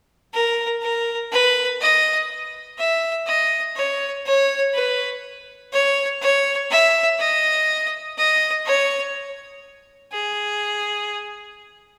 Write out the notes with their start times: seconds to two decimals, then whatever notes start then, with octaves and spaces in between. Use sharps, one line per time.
0.33 A#4
0.82 A#4
1.32 B4
1.81 D#5
2.79 E5
3.27 D#5
3.76 C#5
4.26 C#5
4.74 B4
5.72 C#5
6.22 C#5
6.71 E5
7.19 D#5
8.17 D#5
8.66 C#5
10.13 G#4